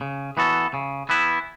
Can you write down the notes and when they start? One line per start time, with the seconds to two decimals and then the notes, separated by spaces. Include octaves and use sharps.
0.01 C#3
0.37 E3 B3 F#4 A4
0.74 C#3
1.09 E3 B3 E4